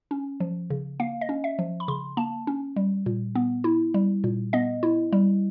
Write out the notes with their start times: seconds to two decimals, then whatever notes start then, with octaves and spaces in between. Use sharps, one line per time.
0.11 C#4
0.40 F3
0.70 C#3
1.00 A#3 F5
1.21 D#5
1.29 C#4
1.44 E5
1.59 F3
1.80 B5
1.88 C#3 C6
2.17 A#3 A5
2.47 C#4
2.76 G3
3.06 A#2
3.35 B3
3.64 E4
3.94 G3
4.24 A#2
4.53 B3 D#5
4.83 E4
5.12 G3